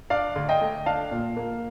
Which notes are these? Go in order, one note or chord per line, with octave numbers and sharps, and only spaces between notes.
D4 D5 F5
D2
D#5 G5
A3
D4 F5 A5
A#2
A#3